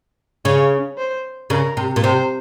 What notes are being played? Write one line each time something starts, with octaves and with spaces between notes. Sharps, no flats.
C#3 C#5
C5
C#3 A#4
C3
A#2
C3 C5